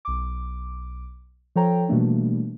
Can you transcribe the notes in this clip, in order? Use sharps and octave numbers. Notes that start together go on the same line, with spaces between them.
B1 D6
F3 A4 C#5 G5 A#5
B2 E3 G3 A3 A#3 D4